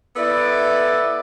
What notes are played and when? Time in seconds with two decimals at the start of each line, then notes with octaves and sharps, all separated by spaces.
0.16 B3 E4 A4 D5